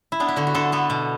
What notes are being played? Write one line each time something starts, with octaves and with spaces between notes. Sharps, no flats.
E4
B3 D4
E4
D3 F#4
F#4
D3 A4
B3 A4
B2